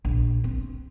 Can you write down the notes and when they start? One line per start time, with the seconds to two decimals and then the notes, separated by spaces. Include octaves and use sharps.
0.05 A#1
0.44 C4